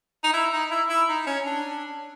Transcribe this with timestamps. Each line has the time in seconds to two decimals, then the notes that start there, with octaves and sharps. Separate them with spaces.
0.24 D#4
0.33 E4
0.53 D#4
0.71 E4
0.89 E4
1.09 D#4
1.27 C#4
1.46 D4